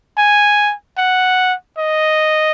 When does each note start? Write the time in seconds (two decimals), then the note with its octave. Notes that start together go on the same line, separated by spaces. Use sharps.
0.18 G#5
0.98 F#5
1.78 D#5